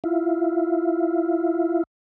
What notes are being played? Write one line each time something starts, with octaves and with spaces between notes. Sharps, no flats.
E4 F4